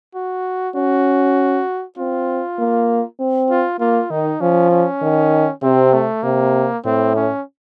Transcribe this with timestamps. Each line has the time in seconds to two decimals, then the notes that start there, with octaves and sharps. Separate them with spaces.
0.15 F#4
0.75 C#4 F#4
1.98 C4 F4
2.59 A#3
3.20 C4
3.50 F4
3.80 A#3 F4
4.10 D#3 D#4
4.41 F3 C#4
4.71 C#4
5.02 D#3
5.63 C3 C4
5.93 A3
6.23 C3 A#3
6.85 A2 C4
7.16 C#4